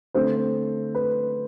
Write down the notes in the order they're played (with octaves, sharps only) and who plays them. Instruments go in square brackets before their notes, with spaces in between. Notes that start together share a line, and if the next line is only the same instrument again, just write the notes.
[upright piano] D3 A3 C4 C5
B4